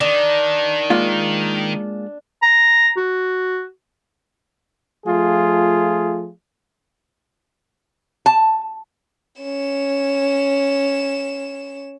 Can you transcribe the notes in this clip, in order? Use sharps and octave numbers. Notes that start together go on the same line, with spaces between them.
D#3 D4
G#3 A#3 F4
A#5
F#4
F3 A3 F4 G#4
A5
C#4 E7